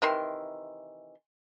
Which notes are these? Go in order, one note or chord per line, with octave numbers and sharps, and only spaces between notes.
C3 D#3 E3 C6